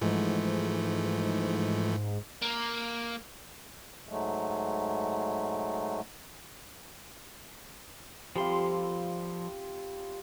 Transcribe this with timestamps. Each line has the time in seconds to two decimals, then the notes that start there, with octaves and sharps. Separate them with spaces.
0.01 G#2 E3 F3 A3
2.42 A#3
4.09 G#2 F#3 G#3 A3
8.36 F3 G3 C4 F4 A4 C6